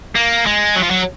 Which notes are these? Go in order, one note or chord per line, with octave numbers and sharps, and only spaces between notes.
A#3
G#3
F#3
F3
F#3